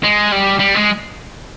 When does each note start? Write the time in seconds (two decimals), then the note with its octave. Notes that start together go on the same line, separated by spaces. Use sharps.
0.04 G#3
0.32 G3
0.60 G3
0.75 G#3